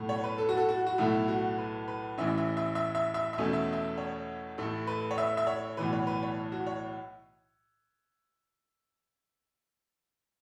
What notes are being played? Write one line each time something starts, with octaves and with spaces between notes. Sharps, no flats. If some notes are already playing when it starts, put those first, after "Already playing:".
Already playing: B1 A2 A3
C#5
B4
A4
F#4
A4
F#4
F#4
B1 A2 A3 E4
F#4
B4
B4
A1 A2 E3 C#4 E5
E5
E5
E5
E5
E5
E5
E2 B2 A3 C#4
E5
E5
C#5
A1 A2 A3 A4
B4
C#5
E5
E5
C#5
B1 A2 E3 B4
C#5
B4
C#5
F#4
C#5